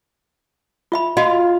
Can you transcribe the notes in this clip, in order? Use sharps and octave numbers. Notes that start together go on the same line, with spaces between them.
F4 E5 B5
F4 F#4 D#5